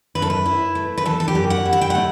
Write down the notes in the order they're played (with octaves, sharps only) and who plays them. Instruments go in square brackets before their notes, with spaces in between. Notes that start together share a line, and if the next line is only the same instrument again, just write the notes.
[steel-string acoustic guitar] F#2 B4
A4
B4
E4
A3
B4
E3 A4
A4
G4
F#2
F#5
E4
F#5
G5
A3 F#5